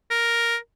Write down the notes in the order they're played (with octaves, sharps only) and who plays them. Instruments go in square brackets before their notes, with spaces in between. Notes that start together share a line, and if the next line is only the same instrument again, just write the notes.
[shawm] A#4